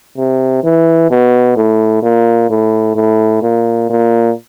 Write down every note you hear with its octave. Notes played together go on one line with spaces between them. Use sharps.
C3
E3
B2
A2
A#2
A2
A2
A#2
A#2